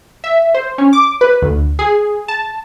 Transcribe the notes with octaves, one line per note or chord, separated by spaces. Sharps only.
E5
C5
C#4
D6
B4
D2
G#4
A5